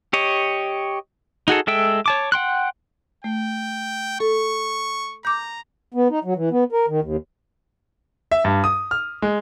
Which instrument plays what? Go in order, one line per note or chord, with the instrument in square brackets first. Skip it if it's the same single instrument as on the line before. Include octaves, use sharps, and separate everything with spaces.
[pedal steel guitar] G4 C#5 D#5
D#4 F#4 G#4 A4
G#3 A4 E5 G5 E6
C#5 A5 D6
F#5 G5 C6 F#6
[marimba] A3 [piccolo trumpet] G5
[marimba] A4 [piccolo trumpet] C#6
[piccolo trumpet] A#5 [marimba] D6 G6
[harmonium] B3
D#4
F#3
E3
B3
A#4
D#3
D#2
[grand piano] E5
G2
D#6
F6
G#3